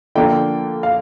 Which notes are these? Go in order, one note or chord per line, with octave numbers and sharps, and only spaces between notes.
D3 F3 A#3 D4 G5
F5